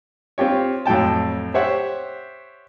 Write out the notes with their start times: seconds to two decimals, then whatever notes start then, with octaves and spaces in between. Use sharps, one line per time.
0.38 C4 F4 G4 C#5
0.86 F2 A2 F#3 G5 A5
1.54 G4 C5 C#5 E5 F#5